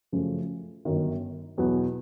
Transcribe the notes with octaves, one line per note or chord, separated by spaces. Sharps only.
F#2 C#3 F3 A3
G1 F#2 D#3
E2 B2 F#3 B3